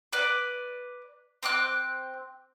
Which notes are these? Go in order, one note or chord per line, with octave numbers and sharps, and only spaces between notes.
B4 D5
C4 G5 D6 F#6